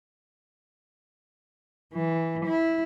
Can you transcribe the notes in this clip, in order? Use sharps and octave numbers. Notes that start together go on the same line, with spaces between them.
E3
E4